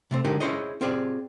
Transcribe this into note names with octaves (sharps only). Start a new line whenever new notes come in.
C3 A3 C4
D3 G#3 D#4 G4 A#4
C#4 E4 G#4 C5 C#5 D#5
C4 F4 G4 G#4 D5